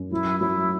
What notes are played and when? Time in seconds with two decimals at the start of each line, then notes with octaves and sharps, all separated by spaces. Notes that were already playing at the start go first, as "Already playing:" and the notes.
Already playing: F#2
0.11 F#3 E4
0.40 F#3 E4